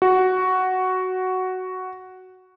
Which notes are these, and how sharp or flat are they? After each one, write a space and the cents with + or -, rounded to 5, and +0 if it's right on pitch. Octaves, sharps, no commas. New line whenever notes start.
F#4 +5